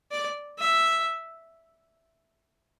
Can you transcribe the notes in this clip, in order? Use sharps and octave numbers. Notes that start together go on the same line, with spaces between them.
D5
E5